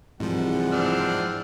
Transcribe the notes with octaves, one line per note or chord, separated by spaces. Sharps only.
C2 G#2 E3 F3 G#4 F#5
C4 D4 F6